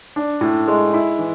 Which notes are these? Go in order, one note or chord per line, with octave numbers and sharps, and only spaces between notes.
D4
A2
G#3
E4
E3